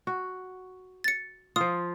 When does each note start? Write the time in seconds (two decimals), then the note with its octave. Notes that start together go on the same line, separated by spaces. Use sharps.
0.07 F#4
1.04 A6 C#7
1.56 F3 F4 D#6